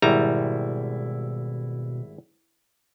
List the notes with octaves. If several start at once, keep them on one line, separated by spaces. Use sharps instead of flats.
G#1 B2 G3 E4 A#5